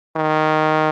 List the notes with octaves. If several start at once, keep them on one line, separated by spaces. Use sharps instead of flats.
D#3